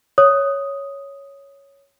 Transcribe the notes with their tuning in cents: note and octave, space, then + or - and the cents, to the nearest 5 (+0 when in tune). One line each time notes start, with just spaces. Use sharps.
C#5 +0 D#6 +0